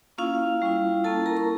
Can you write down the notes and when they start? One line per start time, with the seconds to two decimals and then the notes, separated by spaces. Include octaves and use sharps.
0.18 A#3 C#4 E4 F4 F5
0.62 G3 C#4 E4
1.04 A#3 E4 A4 A5
1.26 A#4 A#5
1.37 C#6